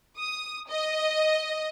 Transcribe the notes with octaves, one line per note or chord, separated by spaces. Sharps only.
D#6
D#5